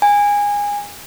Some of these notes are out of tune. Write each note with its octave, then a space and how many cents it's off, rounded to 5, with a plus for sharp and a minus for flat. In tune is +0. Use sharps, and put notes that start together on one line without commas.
G#5 -20